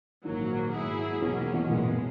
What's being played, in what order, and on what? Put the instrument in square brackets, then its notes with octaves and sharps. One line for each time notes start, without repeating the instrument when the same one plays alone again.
[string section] A#1 G#2 F#3 A#3 [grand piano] D#3
[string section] G#2 F#3 B3 E4 G#4
[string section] E2 D#3 F#3 A#3 C#4 [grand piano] B2
[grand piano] B2
[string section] G#1 F#2 E3 G#3 [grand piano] A#2
[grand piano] B2